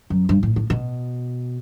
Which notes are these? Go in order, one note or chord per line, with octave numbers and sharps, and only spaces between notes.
F#2
G2
A2
A2
B2